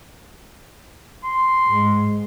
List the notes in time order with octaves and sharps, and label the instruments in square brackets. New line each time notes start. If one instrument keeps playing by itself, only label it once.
[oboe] C6
[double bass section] G#2 G#3